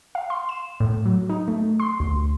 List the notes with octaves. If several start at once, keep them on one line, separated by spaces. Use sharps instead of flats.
F5
C6
E7
A2
F#3
D#4
A3
C6
D2